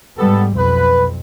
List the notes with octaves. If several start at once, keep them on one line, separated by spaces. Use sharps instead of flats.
G#2 G3 B3 A4
B1 F2 B4